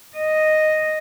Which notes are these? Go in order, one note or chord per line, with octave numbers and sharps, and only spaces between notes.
D#5